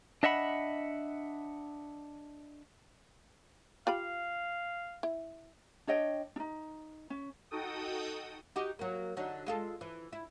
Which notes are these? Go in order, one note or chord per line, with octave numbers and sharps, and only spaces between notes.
D4 D#5 E5 F#5 B5
F4 G4 F5 B5
E4
D4 C#5 D#5 G5
D4 D#4
C#4
D#4 F#4 A4 G5 D#6
D#4 F#4 G4
F#3 A#3
D3 F#3 D#4
G#3 F4 A4
E3
E4